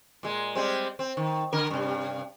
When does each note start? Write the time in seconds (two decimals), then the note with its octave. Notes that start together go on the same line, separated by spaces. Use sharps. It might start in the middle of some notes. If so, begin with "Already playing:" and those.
0.23 A#2 G#3
0.55 G3 G#3 C4
0.99 C4
1.17 D#3
1.53 D3 A#4
1.70 G2 C3